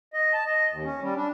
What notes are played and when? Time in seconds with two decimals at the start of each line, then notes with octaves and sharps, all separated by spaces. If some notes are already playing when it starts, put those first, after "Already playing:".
0.14 D#5
0.33 A5
0.46 D#5
0.70 D#2
0.84 C#4
1.02 G3
1.16 D4